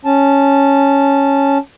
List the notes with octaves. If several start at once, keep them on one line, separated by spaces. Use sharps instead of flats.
C#4 A5